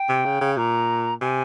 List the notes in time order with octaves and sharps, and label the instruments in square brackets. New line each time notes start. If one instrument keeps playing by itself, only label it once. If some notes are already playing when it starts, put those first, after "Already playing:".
Already playing: [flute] G5
[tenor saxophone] C3
C#3
C#3
[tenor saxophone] A#2 [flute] A#5
[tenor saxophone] C3 [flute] G#5